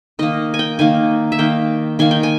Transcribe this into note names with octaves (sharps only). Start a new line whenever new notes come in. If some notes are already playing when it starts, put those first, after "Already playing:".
D#3 A#3 D#5
G#5
G5
D#3 A#3 G#5
E5
D#3 A#3 G5
D#3 A#3 G#5
G5
G#5